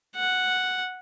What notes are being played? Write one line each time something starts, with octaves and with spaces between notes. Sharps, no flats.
F#5